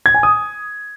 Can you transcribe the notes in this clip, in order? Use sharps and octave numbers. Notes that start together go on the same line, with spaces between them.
G#6
G#5
D#6